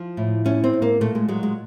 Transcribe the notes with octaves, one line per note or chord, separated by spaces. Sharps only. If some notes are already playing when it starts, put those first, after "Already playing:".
Already playing: F3
A2
A2 C#4
C4
A2
A#3
A#2 A3
G#3
F#3 G#3
G#3